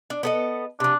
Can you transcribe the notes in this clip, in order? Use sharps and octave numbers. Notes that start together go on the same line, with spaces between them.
D4
B3 A4 D#5
C3 F3 D4